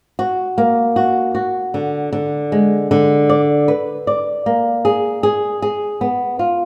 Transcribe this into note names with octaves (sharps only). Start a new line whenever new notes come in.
F#4
A#3
F#4
F#4
D3
D3
G#3
D3
D5
B4
D5
A#3
G#4
G#4
G#4
B3
F4